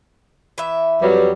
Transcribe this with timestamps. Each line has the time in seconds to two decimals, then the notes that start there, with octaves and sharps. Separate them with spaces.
0.58 E3 E5
1.02 F2 F#3 G3 B4